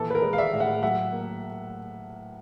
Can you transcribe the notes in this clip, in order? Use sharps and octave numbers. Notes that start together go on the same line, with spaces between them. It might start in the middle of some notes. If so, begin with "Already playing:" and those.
Already playing: A#2 E3 A4
B4
A#4
G#3
F5
D5 E5
A2
E5 F#5
F#3 E5 F#5
A#3